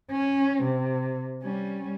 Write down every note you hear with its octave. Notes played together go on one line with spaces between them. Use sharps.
C#4
C3
G3 C#4